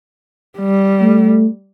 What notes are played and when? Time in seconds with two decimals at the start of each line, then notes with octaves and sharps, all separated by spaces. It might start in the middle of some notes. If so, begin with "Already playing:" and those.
0.59 G3
1.01 A3